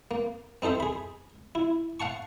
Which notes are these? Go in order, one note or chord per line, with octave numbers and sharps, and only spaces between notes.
A#3
C4 D#4 A4 C5 E5
G#4 B5
E4
F5 F#5 A5 C#6